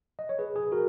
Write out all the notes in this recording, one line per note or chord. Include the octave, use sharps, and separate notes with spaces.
D#5
C#5
G#4 B4
G#4
F#4 A#4